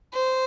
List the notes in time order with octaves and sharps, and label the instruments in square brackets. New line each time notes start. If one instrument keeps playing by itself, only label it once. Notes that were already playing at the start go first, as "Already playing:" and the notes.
[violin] C5